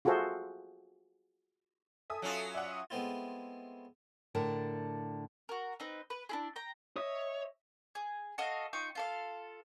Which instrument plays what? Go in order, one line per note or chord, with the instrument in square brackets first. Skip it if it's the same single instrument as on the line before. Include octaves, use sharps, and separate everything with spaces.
[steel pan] F4 F#4 G#4 A4 C5 E5
[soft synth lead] A4 [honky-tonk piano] E5 G#5 D#6
[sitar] F#3 C#4 F4
[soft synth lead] D5 [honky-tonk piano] E5 F#5
[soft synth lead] D#6
[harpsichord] G#3 A3 B3 C4 E4 F4
[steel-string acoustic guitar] A2 D3 A#4 D5 A5
[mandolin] F#4 A#4
C4 D#4 B4
B4
D4 E4 G#4
G5 A#5
[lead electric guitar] C#5 [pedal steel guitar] D#5 E5 D#6
[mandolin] G#4
F#4 A4 D#5 F5
D#4 F4 G5 C#6
F4 A4 F5